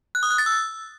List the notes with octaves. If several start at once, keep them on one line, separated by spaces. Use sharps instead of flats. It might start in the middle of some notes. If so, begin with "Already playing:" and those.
F#6
D#6
F#6
A6
E6